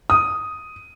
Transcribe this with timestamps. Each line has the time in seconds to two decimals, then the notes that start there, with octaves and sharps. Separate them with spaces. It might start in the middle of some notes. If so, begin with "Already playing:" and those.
0.10 D#6